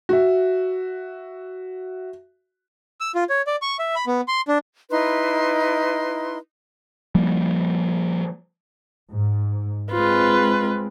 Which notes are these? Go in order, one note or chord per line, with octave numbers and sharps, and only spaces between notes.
F#4 E5
E6
F4
C#5
D5
C#6
E5
B5
B3
C6
D4
D#4 E4 B4 C6
F3 G3 A#3
G#2
G#3 C4 F4 B4